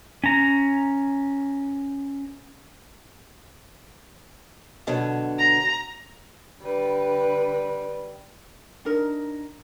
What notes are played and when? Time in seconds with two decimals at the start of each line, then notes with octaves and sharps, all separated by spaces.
0.24 C#4 A#5
4.87 B2 D3 F#3
5.39 A#5
6.62 D3 G3 B4
8.85 D4 D#4 A#4